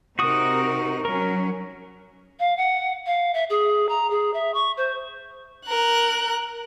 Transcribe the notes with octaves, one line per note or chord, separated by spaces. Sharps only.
C3 D#4 F#4 A#4 D#6
F#3 C#4 A#4
F5
F#5
F5
E5
G#4
A#5
G#4
E5
C#6
C5
A#4 F#6